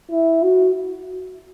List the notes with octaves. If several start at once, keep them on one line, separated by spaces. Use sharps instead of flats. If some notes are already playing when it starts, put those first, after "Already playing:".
E4
F#4